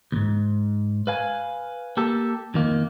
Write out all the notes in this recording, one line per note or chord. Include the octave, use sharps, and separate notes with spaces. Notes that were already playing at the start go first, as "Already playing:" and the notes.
D2 G#2
B4 F5 G#5
A#3 G4 A4
F2 D#3 A#3